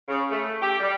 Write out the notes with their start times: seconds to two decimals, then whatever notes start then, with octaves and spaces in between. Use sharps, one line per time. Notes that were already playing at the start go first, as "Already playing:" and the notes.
0.07 C#3
0.29 A3
0.60 G4
0.80 G3